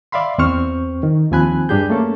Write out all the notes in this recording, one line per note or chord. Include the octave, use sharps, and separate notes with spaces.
D5 E5 F5 B5 C6
E2 C4 C5 C#6 F6
D#3
D#2 F3 C4 G#5 B5 F#6
G2 D4 G4 G#4 G6
A3 A#3 C#4 A4